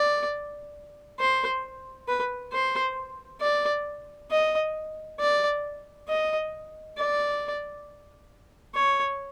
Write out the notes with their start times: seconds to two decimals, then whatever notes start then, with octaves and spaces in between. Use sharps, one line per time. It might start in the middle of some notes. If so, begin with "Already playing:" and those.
Already playing: D5
1.19 C5
2.08 B4
2.52 C5
3.41 D5
4.31 D#5
5.19 D5
6.08 D#5
6.97 D5
8.75 C#5